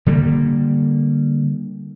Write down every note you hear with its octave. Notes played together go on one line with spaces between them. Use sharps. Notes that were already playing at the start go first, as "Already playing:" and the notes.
D3 G3 A#3